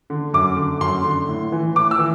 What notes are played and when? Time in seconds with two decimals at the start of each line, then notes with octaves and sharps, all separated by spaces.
0.10 D3
0.33 F#2 D6
0.57 D3
0.80 F#2 C6
1.05 D3
1.28 A2
1.52 E3
1.75 A2 D6
1.91 E6
1.99 E3